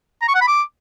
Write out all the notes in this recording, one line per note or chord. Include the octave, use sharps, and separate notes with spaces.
A#5
C#6
F#5
B5
D6